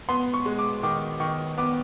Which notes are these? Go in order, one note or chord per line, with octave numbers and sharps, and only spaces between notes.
B3 C6
C#6
G#3
D6
D#3 D6
D#3 C#6
B3 D6